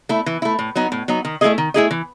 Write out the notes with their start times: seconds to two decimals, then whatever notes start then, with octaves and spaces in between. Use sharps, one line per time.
0.09 A3 E4
0.26 E3
0.42 A3 E4
0.59 A2
0.76 F#3 B3 D#4
0.92 A2
1.08 F#3 B3 D#4
1.25 D#3
1.41 A3 E4 G#4 D#5
1.58 D#3
1.74 A3 E4 G#4 D#5
1.91 E3